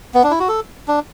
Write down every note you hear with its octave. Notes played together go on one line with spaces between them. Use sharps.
B3
D4
E4
F#4
A4
D4